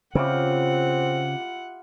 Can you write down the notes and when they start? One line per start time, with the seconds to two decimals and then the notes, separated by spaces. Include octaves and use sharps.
0.15 C#3 C4 E4 F4 G4 F#5